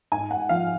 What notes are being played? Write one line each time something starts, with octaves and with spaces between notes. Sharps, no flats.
G#2 G#5
F#5
F3 F5